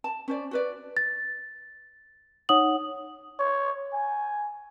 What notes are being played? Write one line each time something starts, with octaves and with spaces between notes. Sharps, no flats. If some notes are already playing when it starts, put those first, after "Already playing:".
A5
C#4 C5 D5
F#4 B4 D5
A6
D#4 C#5 F#5 D#6 F#7
C#5
G#5